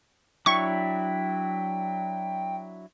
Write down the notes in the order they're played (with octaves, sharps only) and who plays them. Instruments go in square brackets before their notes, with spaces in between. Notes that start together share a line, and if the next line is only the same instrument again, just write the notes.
[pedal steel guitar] F#3 D4 E4 [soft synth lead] G5 [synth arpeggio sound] C#6